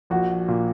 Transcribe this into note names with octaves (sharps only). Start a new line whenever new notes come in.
A#1 F#4
A#2